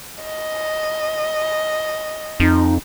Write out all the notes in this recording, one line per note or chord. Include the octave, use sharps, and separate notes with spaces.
D#5
F2 D#4